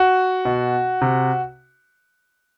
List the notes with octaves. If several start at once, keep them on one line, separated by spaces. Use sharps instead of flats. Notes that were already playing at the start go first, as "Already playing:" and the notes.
Already playing: F#4
B2
C3